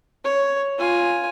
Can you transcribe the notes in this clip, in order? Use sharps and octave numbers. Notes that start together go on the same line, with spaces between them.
C#5
F4 G#5